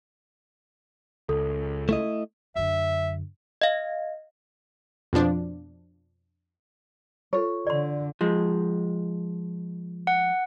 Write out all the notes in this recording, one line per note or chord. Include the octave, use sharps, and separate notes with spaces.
C#2 A4
A3 E4 D#5
F#2 D3 E5
D#5 F5
F2 B2 F3 D4
F4 A4 C#5
D3 D5 C6
F3 G#3
F#5